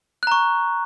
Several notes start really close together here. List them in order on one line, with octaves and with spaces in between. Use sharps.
F#6 A#5 C#6